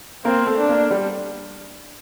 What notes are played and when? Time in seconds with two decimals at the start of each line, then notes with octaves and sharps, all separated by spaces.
0.25 A#3 C4 A#4
0.47 A3 A4
0.58 D4
0.69 A#3 A#4
0.91 G3 G4